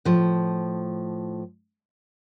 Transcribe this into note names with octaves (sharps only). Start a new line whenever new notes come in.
A2 F3